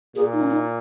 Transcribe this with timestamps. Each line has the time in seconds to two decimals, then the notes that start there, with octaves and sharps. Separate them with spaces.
0.15 A#2 G#4
0.33 D#4
0.41 C#4
0.51 D#4